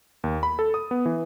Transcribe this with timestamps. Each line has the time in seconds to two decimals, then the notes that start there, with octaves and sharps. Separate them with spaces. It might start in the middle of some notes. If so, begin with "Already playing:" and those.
0.24 D#2
0.43 B5
0.59 A4
0.74 D#6
0.91 B3
1.06 E3